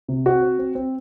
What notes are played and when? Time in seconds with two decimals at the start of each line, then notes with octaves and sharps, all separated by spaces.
0.08 C3
0.26 C4 F#4
0.42 C4
0.59 C4
0.75 C4